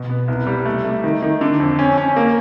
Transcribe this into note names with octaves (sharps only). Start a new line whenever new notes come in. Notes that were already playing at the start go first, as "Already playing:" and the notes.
Already playing: B2
B3
C2
G3
A3
A3
D#3
D#3
D3
F2
C#4
C#4
A#3